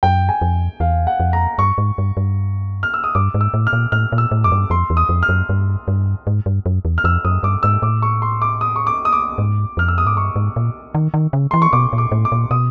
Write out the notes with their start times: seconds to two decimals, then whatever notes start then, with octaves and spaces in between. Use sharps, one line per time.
0.03 F#2 G5
0.29 G#5
0.42 F2
0.80 E2 F5
1.07 F#5
1.20 F2
1.33 A#5
1.58 G2 C#6
1.78 G#2
1.98 G2
2.17 G2
2.83 F6
2.94 E6
3.04 D#6
3.15 G2 D6
3.34 G#2
3.41 E6
3.54 A2
3.67 F6
3.73 A#2
3.92 A2 F6
4.12 A#2
4.18 E6
4.31 A2
4.44 F#2 D6
4.52 G2
4.70 F2 C6
4.90 E2
4.97 D#6
5.09 F2
5.23 F6
5.29 F#2
5.49 G2
5.88 G2
6.27 G#2
6.46 G2
6.66 F#2
6.85 E2
6.98 F6
7.04 F2 E6
7.25 F#2 D#6
7.43 G2 D6
7.63 G#2 E6
7.82 A2 D6
8.02 C#6
8.22 C6
8.42 D6
8.61 D#6
8.76 C#6
8.87 D6
9.05 D#6
9.13 D6
9.38 G#2
9.77 F2 F6
9.88 E6
9.98 D#6
10.06 G#2 D6
10.17 G2 C#6
10.36 G#2
10.56 A#2
10.95 D#3
11.14 D#3
11.33 C#3
11.51 E3 C6
11.62 C#6
11.73 B2 D6
11.93 A#2
11.98 D6
12.12 A2
12.25 D6
12.32 A#2
12.51 B2 D#6